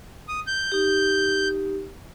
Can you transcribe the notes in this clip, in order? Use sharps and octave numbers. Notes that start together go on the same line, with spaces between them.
D#6
G6
D#4 G4